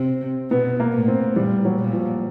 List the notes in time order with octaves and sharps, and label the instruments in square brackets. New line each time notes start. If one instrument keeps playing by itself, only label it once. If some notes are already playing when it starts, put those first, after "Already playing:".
Already playing: [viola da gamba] C3 [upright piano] C4
[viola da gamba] B2 [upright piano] B3
[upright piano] A#3
[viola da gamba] A2
[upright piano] C4
[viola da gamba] A#2 [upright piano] G3
[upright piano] F#3
[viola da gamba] A#2
[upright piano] F3